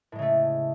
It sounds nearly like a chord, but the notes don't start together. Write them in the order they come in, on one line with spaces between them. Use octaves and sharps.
A2 G#3 C#3 A3